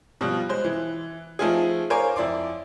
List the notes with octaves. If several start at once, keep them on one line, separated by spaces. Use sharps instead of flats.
B2 F3 G3 F4 F#6
G#3 C5
E3
F3 A3 C4 D#4 F4 G#4
A#4 C5 C#5 F5 G#5 D6
F2 E4 D5 C6 D6